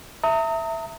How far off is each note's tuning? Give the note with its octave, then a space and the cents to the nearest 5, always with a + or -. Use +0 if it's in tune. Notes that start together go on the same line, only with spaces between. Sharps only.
E5 +0 A#5 -35 D#6 +30